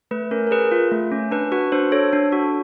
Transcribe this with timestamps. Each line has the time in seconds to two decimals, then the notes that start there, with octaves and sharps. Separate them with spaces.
0.11 A3 B4
0.31 C#4 A#4
0.47 A#4
0.51 G#4 B4
0.72 F4
0.92 A3
1.12 C#4
1.31 D4 B4
1.52 F#4 B4
1.72 D4 C5
1.92 A4 C#5
2.13 D4
2.32 F#4